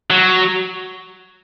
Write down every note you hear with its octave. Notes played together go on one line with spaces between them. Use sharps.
F#3